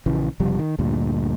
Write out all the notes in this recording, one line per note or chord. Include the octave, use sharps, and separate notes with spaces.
A#1 C#3 E3
F#1 C3 F3 G3
D#3
D2 G2 A#2